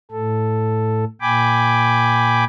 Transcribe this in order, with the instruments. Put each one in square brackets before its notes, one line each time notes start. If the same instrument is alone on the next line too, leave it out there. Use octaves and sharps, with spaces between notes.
[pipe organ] A2 A4
A#2 G5 G#5 B5 D6